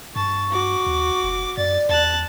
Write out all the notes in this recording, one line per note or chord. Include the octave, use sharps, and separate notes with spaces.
G2 A5 C#6
F#4 D6
D#2
F1
F#2 D5 A6
E2 A5 F#6